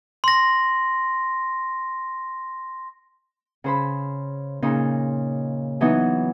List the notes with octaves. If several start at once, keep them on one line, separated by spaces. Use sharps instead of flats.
C6 A#6
C#3 C5 B5
A#2 C#3 D#4
E3 F#3 B3 D#4